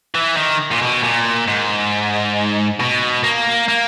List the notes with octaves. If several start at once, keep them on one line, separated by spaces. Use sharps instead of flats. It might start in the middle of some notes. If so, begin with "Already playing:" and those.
E3
D#3
A#2
B2
A#2
G#2
B2
A#3
A#3